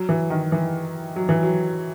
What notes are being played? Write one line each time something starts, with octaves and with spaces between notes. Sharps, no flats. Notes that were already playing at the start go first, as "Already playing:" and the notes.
Already playing: F#3
E3
D#3
E3
F#3
E3
F#3